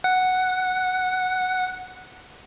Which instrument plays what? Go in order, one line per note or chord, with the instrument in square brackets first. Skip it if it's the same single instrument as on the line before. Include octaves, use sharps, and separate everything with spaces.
[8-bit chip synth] F#5